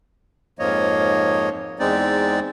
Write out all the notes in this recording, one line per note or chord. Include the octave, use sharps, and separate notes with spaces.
F2 G#2 F3 A#3 C#5 D#5
E2 G#3 C4 D#4 D5